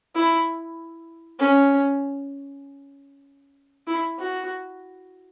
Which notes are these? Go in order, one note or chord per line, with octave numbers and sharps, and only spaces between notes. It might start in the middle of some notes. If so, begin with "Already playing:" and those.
E4
C#4
E4
F#4